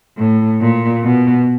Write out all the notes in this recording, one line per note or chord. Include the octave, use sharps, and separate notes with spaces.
A2
A#2
B2